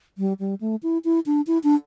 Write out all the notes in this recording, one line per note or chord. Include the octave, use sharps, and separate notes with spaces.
G3
G3
A3
E4
E4
D4
E4
D4